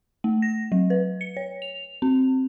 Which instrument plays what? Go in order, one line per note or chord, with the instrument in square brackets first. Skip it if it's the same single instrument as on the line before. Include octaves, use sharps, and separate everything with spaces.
[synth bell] A3
A#6
F#3
B4
C#7
C#5
F7
C4